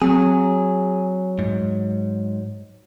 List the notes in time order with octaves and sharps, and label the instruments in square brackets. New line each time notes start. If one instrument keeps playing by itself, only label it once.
[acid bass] F#3 [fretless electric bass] C4 [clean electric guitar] G#4
[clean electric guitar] G#2